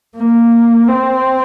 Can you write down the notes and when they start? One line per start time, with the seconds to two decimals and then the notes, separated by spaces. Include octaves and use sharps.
0.17 A#3
0.88 C4